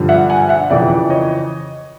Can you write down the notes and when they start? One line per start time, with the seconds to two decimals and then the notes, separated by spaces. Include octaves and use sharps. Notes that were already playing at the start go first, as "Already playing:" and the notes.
Already playing: G2 D3 F3
0.09 E5 F#5
0.30 F#5 G#5
0.49 E5 F#5
0.70 F2 C#3 E3 D5 E5
1.10 C#5 D#5